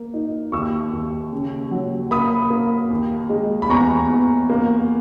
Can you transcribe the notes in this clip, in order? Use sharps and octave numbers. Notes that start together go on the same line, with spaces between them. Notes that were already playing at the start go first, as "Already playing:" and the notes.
Already playing: A#3
D#4
D#2 C#6 E6
D#2
C#3
F#3
A#3 B5 D#6
A#3
D#2
G#3
B5
E2 A#5 C#6
E2
A#3